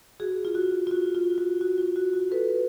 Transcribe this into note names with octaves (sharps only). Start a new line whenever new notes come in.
F#4 G#4
F4
F#4
F4
F#4
F4
F#4
F#4
F4
F#4
F#4
A4 B4